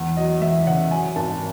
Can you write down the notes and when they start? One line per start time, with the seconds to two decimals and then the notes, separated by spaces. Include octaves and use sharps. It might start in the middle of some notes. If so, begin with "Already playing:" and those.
Already playing: E2
0.17 F#3 D#5
0.42 E2 E5
0.67 C#3 F#5
0.91 F#2 G#5
1.16 G#1 A5